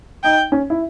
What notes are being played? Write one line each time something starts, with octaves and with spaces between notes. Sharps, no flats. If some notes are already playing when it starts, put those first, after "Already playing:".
D#4 G5
C#4
E4